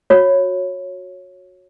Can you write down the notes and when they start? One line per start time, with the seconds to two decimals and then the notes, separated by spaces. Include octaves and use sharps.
0.10 F#4 C#5